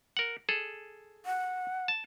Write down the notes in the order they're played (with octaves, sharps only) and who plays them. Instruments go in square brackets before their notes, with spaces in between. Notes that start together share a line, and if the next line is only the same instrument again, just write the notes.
[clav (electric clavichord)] A#4 F#5
G#4 A4
[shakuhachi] F#5
[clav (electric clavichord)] A5